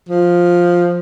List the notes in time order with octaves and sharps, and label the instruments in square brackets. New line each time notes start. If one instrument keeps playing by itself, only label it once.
[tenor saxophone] F3